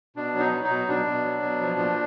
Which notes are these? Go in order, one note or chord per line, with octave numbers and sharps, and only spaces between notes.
B2 D4
F#3
D#4
F#3
D#4
B2
B2 D4
B2
F#3
B2
F3
A#2